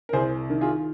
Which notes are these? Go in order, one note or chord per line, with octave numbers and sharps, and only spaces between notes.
A#4
C2 G#4 C5
D#3
F4 G#4